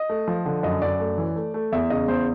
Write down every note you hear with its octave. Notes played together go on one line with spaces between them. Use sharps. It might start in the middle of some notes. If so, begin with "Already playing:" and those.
Already playing: D#5
A3
F3
D3
F#2 D#5
F#2 D5
A3
E3
A3
A3
E2 E5
C#3 D#5
E2 C5